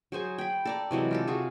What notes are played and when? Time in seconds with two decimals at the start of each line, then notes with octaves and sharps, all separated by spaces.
0.12 F#3 G#4 C5 G#5
0.38 G5 B5
0.65 A4 D5 A#5
0.91 C3 E3 F#3 G#3
1.11 F4 G4 A4
1.28 F4 F#4 G#4